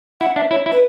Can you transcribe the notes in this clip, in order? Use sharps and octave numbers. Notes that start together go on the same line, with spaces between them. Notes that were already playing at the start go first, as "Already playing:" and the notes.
E4 F#5
D4 E5
E4 C#5
E4
B4